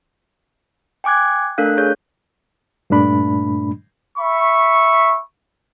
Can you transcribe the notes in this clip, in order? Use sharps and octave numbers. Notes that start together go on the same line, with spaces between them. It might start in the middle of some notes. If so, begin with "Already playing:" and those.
G5 G#5 D6 F#6 G#6
A3 D4 A4 A#4 F5 F#6
G#4 C#5 G6
G2 A#2 A3 D4 B5
E5 B5 C#6